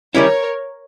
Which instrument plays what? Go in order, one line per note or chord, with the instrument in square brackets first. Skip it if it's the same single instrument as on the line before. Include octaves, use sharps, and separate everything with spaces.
[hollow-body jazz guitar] D#3 G3 C#4 E4 [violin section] A#4 C#5